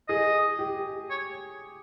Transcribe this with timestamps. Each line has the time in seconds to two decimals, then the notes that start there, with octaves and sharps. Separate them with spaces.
0.08 G#4 D#5
0.59 G4
1.10 C#5